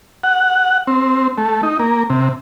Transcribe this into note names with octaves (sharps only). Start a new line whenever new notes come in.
F#5
C4
A3
D#4
A#3
C3